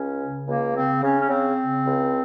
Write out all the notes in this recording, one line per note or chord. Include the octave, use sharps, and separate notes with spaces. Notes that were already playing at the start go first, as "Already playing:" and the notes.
Already playing: C#2 C#4
C#3
C#2 A#3
C#3 C4
C#3 C#4
C#4
C#3 C4
C#3
C#2